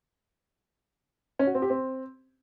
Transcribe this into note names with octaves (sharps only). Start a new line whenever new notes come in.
C#4
F#4
C4
G4
C4